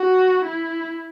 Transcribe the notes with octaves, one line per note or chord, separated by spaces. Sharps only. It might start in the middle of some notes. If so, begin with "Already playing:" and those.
Already playing: F#4
E4